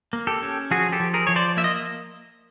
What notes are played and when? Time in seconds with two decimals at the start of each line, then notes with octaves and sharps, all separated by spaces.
0.13 A#3
0.27 G4 A4
0.42 C#4
0.71 F3 F#4 G#4
0.92 G4 A4
1.00 F3
1.14 G#4 A#4
1.27 F3 C#5
1.36 C5 D5
1.57 A#3 E5
1.64 D#5